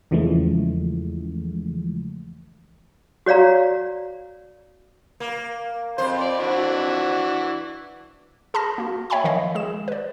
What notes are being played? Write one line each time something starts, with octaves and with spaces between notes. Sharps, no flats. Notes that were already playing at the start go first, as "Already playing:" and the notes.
E2 C#3 E3 F3 G#3 A3
F#4 C#5 D5 F5 A#5
A#3
F2 C5
D5
E3 D4 F#4
G#4 A5 B5 F6 A#6
A#3 F#4
C#5 E5 G5 G#5 B5 C#6
D#3 F3 D#5 F5
G#3 G#4 E7
B4 D5